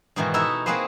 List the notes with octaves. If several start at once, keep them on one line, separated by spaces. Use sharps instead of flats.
G#2 B2 D#3 E3 F#4
D#4 E4 F#4 A4 E5
A#3 C4 F#4 G#4 B4 C5